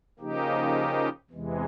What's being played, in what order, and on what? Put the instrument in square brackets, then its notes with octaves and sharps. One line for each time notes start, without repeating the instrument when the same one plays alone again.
[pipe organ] C#3 F3 A#3 D#4 G4
E2 C3 E3 G#3